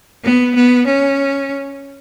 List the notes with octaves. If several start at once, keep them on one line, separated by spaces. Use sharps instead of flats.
B3
B3
C#4